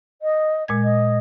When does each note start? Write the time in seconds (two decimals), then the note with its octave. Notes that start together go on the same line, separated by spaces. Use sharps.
0.22 D#5
0.68 A#2 G#3 G#6
0.84 D#5